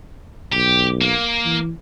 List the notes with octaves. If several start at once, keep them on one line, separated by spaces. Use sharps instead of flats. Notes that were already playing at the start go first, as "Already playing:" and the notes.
B1 G4
A#3
E3